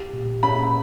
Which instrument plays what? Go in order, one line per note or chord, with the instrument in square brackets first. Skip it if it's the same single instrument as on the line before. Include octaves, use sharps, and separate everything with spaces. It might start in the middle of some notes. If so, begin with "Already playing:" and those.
Already playing: [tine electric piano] G4
A#2
[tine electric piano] C#4 [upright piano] B5